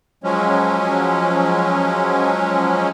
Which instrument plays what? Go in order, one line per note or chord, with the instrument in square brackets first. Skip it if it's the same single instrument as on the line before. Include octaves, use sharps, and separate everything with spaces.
[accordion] F3 F#3 G#3 C#4